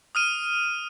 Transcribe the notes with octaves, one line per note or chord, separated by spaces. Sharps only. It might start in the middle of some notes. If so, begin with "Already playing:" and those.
D#6 F6 D#7